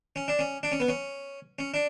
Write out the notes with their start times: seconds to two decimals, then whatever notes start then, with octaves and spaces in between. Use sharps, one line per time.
0.16 C#4
0.28 D4
0.39 C#4
0.63 D4
0.72 C#4
0.80 B3
0.89 C#4
1.59 C#4
1.74 D4